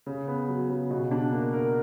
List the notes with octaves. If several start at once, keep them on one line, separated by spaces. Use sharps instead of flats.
C#3
B3
F#3
C#3
B2
D4
A#3
A#4